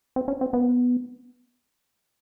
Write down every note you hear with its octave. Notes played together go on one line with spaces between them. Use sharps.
C4
C#4
C4
B3